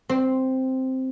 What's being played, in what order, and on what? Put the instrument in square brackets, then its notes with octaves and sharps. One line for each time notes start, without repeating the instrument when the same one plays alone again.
[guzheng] C4